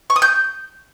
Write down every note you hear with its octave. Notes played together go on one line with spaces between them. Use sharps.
C#6
D#6
G6